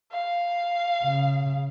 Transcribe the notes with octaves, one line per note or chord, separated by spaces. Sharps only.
F5
C#3